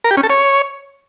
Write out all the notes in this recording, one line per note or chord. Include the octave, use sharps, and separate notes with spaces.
A#4
G4
C#4
A4
C#5